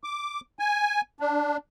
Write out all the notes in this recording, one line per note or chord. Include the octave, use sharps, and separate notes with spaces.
D6
G#5
D4